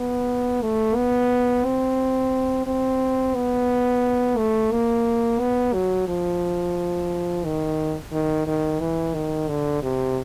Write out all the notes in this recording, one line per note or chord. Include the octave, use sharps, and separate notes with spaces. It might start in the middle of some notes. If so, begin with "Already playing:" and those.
Already playing: B3
A3
B3
C4
C4
B3
A3
A#3
B3
F#3
F3
D#3
D#3
D#3
E3
D#3
D3
C3